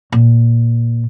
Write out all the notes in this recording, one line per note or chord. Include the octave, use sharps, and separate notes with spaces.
A#2